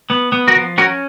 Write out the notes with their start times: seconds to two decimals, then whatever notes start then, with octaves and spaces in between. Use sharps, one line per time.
0.10 B3
0.32 B3
0.48 F#4 A#4
0.56 F3
0.78 C#4 F#4 A#4